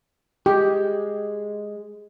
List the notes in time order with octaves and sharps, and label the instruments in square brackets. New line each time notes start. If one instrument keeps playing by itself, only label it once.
[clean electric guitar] G#3 [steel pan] G4